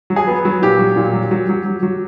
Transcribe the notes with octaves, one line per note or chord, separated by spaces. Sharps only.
F#3
G#4
B3
F#3
A#2 G4
F#3
A#2
F#3
F#3
F#3
F#3
F#3